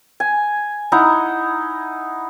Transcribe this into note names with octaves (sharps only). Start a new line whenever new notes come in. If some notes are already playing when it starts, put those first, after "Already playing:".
G#5
D#4 E4 F#5 A#5